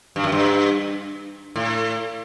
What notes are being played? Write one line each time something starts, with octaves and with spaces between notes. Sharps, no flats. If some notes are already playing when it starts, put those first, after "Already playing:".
G2
F#2
G2
A2